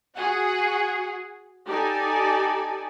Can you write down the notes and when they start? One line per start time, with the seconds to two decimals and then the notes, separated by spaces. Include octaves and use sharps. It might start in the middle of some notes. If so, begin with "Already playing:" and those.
0.16 F#4 G#4 F#5
1.66 D#4 G4 A4 D5 G#5